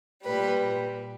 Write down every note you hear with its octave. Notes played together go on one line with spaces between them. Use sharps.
A#2 G3 B4